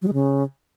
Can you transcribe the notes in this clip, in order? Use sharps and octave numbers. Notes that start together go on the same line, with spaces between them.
F#3
G#3
C#3